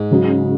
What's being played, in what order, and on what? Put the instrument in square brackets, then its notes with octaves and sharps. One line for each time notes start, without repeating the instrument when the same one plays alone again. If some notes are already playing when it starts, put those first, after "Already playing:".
Already playing: [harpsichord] G#2
[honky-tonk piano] C#3 F#3